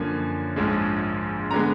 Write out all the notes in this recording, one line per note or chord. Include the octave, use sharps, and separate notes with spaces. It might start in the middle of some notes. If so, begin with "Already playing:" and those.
Already playing: F#2 D3 F3 A#3 G#5
A#1 G#2 F3 G#3
D3 G#3 B3 A#5